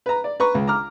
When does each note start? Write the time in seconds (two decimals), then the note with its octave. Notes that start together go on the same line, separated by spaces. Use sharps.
0.06 B4 A#5
0.24 D5
0.40 B4 A#5 C#6
0.55 C#2
0.68 A#5 D6 F6